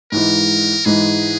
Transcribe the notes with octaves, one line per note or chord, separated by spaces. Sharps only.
G#2 E3 G#3 A#4
G#2 E3 G#3 G#4